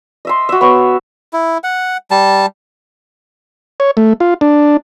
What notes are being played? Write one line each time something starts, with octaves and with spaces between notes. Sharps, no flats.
D#5 E5 C6
F#4 E5
B3 C#5
E4
F#5
G3 A5
C#5
A3
F4
D4